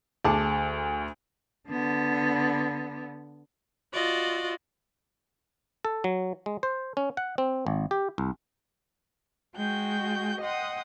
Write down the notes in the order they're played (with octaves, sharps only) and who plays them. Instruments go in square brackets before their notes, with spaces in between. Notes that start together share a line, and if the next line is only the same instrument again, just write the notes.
[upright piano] D2 [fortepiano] G#4 A5 D6
[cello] D3 B3
[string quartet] F4 F#4 D5 D#5
[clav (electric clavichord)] A4
F#3
G#3
C5
C#4
F#5
C4
G#1
G4
C2
[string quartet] G#3 F#4 G5 G6
D#5 F#5 G5 C6 D#6